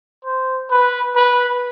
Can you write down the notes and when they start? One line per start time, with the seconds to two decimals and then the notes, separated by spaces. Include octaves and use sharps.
0.25 C5
0.71 B4
1.16 B4